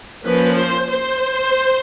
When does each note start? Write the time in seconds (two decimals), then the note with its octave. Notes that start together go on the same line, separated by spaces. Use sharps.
0.24 F3 A#3 C#4 B4
0.57 C5
0.90 C5